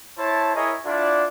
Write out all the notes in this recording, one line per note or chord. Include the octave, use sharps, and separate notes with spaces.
E4 C5 C#5 A5
E4 G#4 A#4 C#5 D#5
D4 E4 F4 A4 D5 F#5